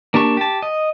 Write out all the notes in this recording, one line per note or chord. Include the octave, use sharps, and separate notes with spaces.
A#3 D4 G4 A5 C#6
G4 A5
D#5